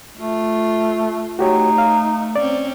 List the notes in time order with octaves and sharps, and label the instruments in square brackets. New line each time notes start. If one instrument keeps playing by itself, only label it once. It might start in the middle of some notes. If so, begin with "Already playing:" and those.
[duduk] A3 [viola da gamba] F4
[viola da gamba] A3 [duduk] D#4 [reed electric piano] F#4 G4 C#5
[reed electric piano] F5
[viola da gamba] C4 C#4 [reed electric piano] D5